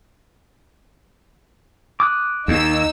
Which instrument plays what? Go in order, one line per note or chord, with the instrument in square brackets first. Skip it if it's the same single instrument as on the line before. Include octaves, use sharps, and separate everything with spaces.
[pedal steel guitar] D6 D#6 F#6
[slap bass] D#2 [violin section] D#4 E6